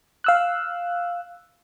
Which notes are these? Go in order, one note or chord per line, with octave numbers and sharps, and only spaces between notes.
F5 E6 F#6